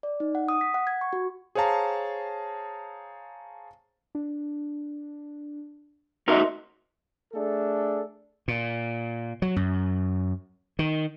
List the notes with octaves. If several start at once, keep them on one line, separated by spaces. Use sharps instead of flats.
D5
D#4
F#5
D#6
B6
F#5
G#6
C#6
F#4
G#4 C5 C#5 F5 A5 A#5
D4
D#4 F#4 A#4 D#5 E5 C6
A3 D4 G#4 A4
A#2
F#3
F#2
D#3